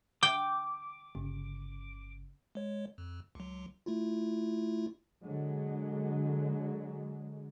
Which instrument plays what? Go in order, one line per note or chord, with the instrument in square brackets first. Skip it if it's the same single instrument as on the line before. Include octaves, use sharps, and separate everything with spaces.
[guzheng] G5 [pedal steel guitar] D6
[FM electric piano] G1 C#3
[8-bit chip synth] G#3 C#5
F2
C#2 F#3
A3 E4 F4
[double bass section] D3 F#3 G#3